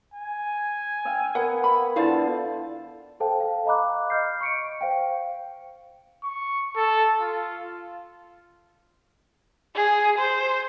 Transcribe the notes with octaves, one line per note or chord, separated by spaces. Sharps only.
G#5
E5 F5 G5
B3 A#4 F#5
B5
D3 E4 F4 C5 F5 A5
A4 C5 F5 G5 A5
F5
D#5 F5 A#5 B5 D6 F#6
D#5 F6 G6 C7
C#6 C#7 D7
C5 F5 G5
C#6
A4
F4
G#4
C5